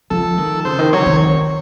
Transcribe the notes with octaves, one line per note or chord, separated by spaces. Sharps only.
F3 A4
D#3
C#3 C5
D#3
F#3 C#5
D#3